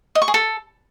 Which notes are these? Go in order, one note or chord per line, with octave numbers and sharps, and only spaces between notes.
D#5
C#6
G#4
A4